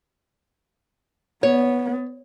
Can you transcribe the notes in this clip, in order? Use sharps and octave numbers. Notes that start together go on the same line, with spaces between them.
B3 C#5